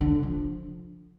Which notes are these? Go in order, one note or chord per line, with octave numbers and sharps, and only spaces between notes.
D3
C3
F3